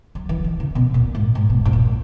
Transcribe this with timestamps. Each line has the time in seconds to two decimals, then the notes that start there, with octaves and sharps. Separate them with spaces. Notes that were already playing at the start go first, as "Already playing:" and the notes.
0.15 F#3
0.29 E3
0.44 D#3
0.60 C#3
0.75 B2
0.94 A#2
1.15 G#2
1.35 G#2
1.50 B2
1.65 G#2
1.73 A#2